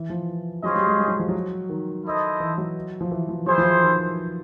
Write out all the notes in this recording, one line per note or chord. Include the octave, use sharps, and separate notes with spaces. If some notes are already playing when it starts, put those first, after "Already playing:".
Already playing: E3
F3
F#3 C#4 F4 G#4 C5 D#5
G3
G#3
G3
F#3
F3
F#3
D#3
E4 A4 C5 D#5
E3
F#3
F3
E3
F3
F#3 E4 G#4 C5
F3
E3
D#3